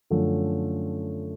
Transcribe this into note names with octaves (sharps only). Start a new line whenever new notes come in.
F#2 D3 F3 A3 C#4